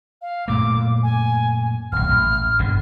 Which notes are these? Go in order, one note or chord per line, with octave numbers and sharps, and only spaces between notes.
F5
F#2 A#2 A3 D6
G#5
D#1 B1 F6
A1
G1 B2 D3